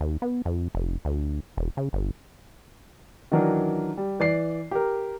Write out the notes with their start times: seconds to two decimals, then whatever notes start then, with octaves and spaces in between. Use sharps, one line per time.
0.01 D#2
0.22 B3
0.45 F2
0.75 F1
1.05 D2
1.57 E1
1.77 C#3
1.93 G1
3.32 D#3 E3 F#3 D4 A#4
3.97 G3
4.20 E3 D5 C7
4.71 G4 A#4